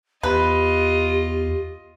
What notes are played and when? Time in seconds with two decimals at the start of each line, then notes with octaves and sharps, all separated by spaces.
0.23 E2 F4 G4 B4 D#5